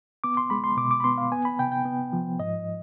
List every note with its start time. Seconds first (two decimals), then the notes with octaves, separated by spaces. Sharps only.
0.24 B3 D6
0.37 C6
0.50 G#3 B5
0.64 C6
0.77 B2 D6
0.91 D6
1.00 B5
1.04 B3 C6
1.18 F5
1.32 B3 G#5
1.45 B5
1.59 C3 G5
1.72 G5
1.85 B3
2.13 F3
2.39 G#2 D#5